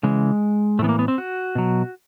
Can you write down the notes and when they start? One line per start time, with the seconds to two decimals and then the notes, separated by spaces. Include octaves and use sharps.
0.03 C#3 E3 G#3
0.79 A2 A3
0.82 E3 B3
0.89 A#3
0.99 B3
1.08 C4
1.18 F#4
1.55 B2 F#3